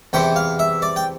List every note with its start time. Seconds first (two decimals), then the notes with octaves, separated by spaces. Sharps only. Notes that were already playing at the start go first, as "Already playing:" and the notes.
0.13 E2 C3 E3 G5
0.36 F5
0.59 E5
0.82 D5
0.96 G5